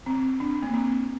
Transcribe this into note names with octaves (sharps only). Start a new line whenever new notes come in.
C4
D4
A#3
C4